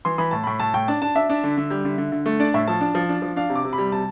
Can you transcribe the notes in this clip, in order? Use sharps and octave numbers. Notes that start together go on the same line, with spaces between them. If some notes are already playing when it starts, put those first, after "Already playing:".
E3 C6
E3 B5
A2 A5
A2 B5
A2 A5
A2 G5
D4 A5
D4 A5
D4 E5
D4
D3
D3
G3
D3
D3
D3
A3
D4 D5
A2 E5
F3 A5
D4
F3
D4
F3
D4 F5
C3
D6
C3
B5
G3
C3 A5